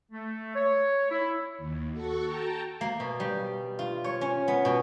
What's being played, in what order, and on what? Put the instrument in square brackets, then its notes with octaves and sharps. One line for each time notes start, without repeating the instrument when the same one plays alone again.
[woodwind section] A3
C#5
E4
[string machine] D#2
F#4 A4 C#6
G5 A5 A#5
[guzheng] A#3
B2
G3
F4
C#5
C#4
B3
B2